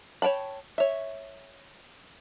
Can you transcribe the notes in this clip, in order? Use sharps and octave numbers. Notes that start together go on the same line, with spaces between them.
C#5 G5 A5 B5
C#5 E5